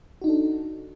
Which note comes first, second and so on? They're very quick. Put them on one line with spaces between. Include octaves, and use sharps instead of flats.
F#4 D#4 D4 A4